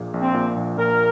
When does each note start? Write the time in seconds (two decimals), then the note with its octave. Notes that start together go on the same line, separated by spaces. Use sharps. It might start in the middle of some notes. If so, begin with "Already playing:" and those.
Already playing: A#1 A#2 A#3 G#4
0.14 A#1
0.20 C4
0.34 A#2
0.56 A#1
0.77 A#2 A#4